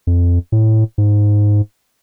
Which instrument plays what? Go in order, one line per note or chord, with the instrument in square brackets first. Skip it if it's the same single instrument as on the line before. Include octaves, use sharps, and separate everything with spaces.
[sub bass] F2
A2
G#2